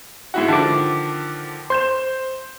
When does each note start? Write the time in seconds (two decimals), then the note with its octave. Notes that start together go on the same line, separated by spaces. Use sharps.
0.34 G#2 E4 F#4
0.48 D3 D#3 F3 A5 D6
1.70 C5 C6 G6 E7